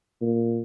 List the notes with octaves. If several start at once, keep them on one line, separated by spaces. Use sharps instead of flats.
A#2